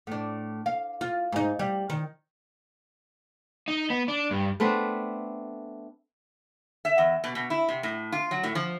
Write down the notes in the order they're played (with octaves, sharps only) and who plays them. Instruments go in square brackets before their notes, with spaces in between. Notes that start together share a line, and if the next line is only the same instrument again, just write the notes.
[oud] A2 D4
F5
F4
G#2 D#4
G3
D#3
[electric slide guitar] D#4
B3
D4
G2
[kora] A3 B3 C4 D4
[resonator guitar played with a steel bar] E5
E2
B2
B2
E4
C3
A2
F4
F#3
A2
F3